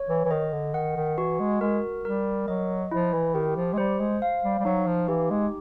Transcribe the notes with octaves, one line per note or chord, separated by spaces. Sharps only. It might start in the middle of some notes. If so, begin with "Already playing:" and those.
Already playing: C#5
E3
E3
D#3 D#5
D3
D#3 F#5
D#3
E3 F#4
G#3
G#3 A#4
G3 A#4
F#3 D#5
F3 E4
E3
D#3 G4
F3
G#3
G3 C5
G#3
F5
G3
G3
F#3 D#4
F3
E3 G4
G#3